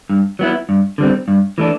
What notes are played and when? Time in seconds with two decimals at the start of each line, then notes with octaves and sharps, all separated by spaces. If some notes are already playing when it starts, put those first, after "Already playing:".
0.10 G2
0.39 F#3 B3 E4
0.69 G2
0.98 D3 G3 C4
1.28 G2
1.58 E3 A3 D4